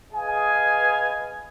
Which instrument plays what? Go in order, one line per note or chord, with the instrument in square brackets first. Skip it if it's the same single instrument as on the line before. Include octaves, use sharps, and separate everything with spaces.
[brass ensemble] G#4 B4 D#5 F5 G#5